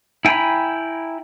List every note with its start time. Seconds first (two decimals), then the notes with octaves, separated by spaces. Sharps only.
0.25 E4 G5 G#5 A#5 B5